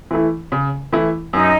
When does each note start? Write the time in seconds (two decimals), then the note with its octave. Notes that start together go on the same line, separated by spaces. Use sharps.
0.11 E3 A3 E4
0.52 C#3
0.93 E3 A3 E4
1.33 F#2 D#4